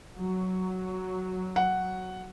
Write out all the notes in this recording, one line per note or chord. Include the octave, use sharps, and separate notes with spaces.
F#3
F#5